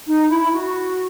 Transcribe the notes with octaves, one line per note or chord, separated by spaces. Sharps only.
D#4
E4
F#4